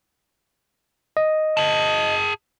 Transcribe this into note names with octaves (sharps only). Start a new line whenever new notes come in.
D#5
G#4 A5